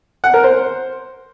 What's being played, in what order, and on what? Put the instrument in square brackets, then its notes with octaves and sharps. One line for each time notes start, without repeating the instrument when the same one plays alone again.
[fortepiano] F#5
A#4
C5